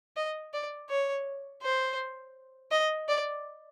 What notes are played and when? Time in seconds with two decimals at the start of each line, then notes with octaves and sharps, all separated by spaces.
0.16 D#5
0.54 D5
0.89 C#5
1.62 C5
2.71 D#5
3.08 D5